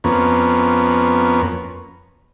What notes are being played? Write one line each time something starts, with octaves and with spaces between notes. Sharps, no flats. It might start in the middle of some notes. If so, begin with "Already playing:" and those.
F2 A#3 B3 C#4